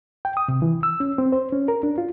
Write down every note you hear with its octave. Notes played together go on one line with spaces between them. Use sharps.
G5
D#6
C3
E3
E6
C#4
C4
C5
C#4
A#4
D4
F4